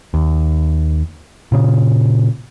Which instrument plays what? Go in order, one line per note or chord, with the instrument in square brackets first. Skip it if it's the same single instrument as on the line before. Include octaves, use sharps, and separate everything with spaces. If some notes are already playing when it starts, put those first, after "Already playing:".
[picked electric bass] D#2
A#2 C#3